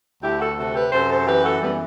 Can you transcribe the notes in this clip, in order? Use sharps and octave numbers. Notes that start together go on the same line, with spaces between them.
D2 E4 G4
F#4 A4
C3 F#4 A4
G4 B4
F#2 A4 C5
A4 C5
E3 G4 B4
F#4 A4
F#2 G3 B3